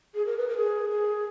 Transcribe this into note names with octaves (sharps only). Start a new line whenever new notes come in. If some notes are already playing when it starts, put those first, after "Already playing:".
G#4
A#4
B4
A#4
G#4
G#4